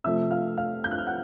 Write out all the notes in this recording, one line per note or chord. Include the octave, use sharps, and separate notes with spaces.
C3 F3 A3 E5 E6
F5 F6
F5 F6
G6
F#6
F6
F#5 F#6